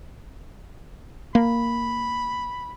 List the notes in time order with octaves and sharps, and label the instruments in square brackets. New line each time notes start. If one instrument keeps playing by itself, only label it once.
[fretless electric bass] A#3 [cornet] B5